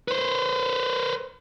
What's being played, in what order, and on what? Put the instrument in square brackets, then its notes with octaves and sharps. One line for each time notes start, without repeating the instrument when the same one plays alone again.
[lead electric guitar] B4 C5